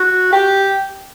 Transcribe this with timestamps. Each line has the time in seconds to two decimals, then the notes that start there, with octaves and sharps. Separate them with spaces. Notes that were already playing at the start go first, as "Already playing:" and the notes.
Already playing: F#4
0.33 G4